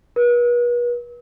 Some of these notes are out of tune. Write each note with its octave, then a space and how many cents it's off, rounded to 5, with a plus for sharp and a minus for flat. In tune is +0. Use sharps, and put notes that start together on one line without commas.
B4 -40